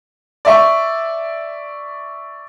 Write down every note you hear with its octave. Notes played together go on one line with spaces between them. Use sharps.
D5 E5 C#6